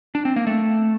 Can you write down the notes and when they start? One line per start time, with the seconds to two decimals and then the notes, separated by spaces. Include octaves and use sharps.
0.15 D4
0.25 C4
0.36 A#3
0.47 A3